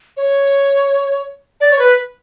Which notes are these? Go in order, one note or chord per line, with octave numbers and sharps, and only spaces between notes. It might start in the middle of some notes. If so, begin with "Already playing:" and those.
C#5
D5
C#5
B4